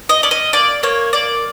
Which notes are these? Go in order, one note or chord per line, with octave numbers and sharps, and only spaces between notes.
D#5
C#4 D5
D#5
A#3 D5
A#3 C#5
A#3 D5